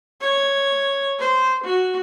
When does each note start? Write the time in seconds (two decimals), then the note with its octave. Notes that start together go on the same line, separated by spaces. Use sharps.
0.21 C#5
1.19 C5
1.64 F#4